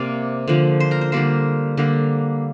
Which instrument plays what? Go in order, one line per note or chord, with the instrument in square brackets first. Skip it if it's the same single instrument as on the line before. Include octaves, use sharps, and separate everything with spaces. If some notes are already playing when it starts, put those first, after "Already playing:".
Already playing: [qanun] C3 A#3 D5 F5
D3 F3 A#3
C5
A#4
C5
D3 G3 A#3 C5
D3 G3 A#3